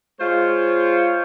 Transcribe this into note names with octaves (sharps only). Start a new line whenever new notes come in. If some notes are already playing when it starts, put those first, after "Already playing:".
G#3 F4 C5 C#5